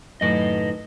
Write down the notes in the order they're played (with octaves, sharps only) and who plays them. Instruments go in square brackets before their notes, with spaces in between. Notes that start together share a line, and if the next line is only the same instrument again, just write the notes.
[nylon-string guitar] F#2 A2 D#3 [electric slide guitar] B4 D#5